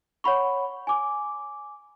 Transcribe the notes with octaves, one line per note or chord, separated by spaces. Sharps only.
C#5 F#5 B5 C#6
G#5 D6